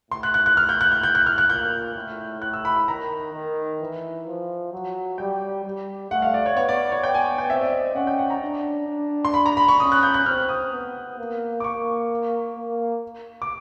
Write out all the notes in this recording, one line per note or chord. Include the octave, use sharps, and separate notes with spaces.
A2 C6
F#6
F#6
F#6
A2 F6
G6
F#6
G6
G6
F#6
F6
F#6
A#2 G6
A2
A2 F#6
E6
B5
B5
D#3 A#5
D#3
E3
F3
F#3
G3 G5
G3
A3 F#5
F5
D5
C#5
B3 C#5
D5
C#5
G5
G#5
G5
C4 E5
D5
D#5
C#4 F#5
G5
F#5
A#5
D4
D4
C6
B5
A#5
B5
C#6
C#4 D#6
F#6
G6
F#6
C4 F6
D#6
B3
A#3
D6
A#3 C#6
A#3
D6